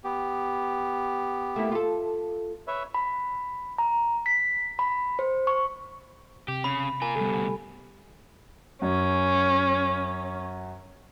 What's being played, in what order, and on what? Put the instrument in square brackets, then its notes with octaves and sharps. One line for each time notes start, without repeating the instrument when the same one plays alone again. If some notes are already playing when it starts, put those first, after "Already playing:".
[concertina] B3 G4
[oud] A3 A#3 E4
F4 A4
[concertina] B4 C#5 E5
[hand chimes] B5
A#5
B6
B5
C5
C#6
[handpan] C3 [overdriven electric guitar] G4
[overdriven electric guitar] C#3 [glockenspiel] B5
[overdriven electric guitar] F4 A#4 [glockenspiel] G#5
[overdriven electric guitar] D2 B2 [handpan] G3 A4
[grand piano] F#2 [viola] C#4